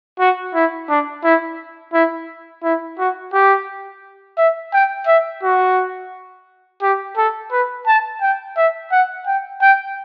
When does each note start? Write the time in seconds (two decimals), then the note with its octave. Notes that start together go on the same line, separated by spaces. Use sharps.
0.19 F#4
0.54 E4
0.89 D4
1.24 E4
1.93 E4
2.63 E4
2.98 F#4
3.33 G4
4.38 E5
4.73 G5
5.07 E5
5.43 F#4
6.82 G4
7.17 A4
7.51 B4
7.87 A5
8.21 G5
8.57 E5
8.91 F#5
9.27 G5
9.61 G5